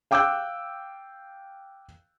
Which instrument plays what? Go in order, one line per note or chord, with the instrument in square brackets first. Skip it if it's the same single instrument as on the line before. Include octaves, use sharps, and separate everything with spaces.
[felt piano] F5 G5 D6 E6 F#6 G6